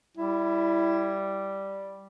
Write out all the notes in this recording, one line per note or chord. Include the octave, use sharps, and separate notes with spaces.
G3 E4